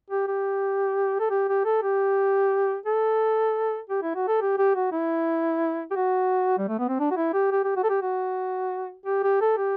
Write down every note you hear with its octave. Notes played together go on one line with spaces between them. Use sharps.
G4
G4
A4
G4
G4
A4
G4
A4
G4
E4
F#4
A4
G4
G4
F#4
E4
G4
F#4
G3
A3
B3
C4
D4
F#4
E4
G4
G4
G4
F#4
A4
G4
F#4
G4
G4
A4
G4